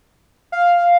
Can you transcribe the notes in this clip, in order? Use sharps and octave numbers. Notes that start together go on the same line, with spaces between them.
F5